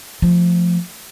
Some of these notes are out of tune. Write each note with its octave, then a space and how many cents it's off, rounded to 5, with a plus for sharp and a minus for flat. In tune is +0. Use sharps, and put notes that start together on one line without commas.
F3 +0 A3 +0